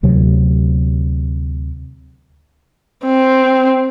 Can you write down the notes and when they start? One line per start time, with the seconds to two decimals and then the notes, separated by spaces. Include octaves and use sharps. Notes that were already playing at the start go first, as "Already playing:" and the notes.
0.03 D2 C3 F#3
3.06 C4